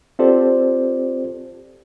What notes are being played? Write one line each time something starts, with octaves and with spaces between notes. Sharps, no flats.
C4 F4 G4 A4 C5 D5